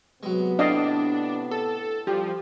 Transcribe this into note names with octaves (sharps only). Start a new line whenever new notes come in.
C3 F#3 G#3 B3
A2 D4 D5 D#5 F5
A4
F3 G3 G4